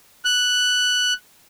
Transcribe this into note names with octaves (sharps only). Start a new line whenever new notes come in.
F#6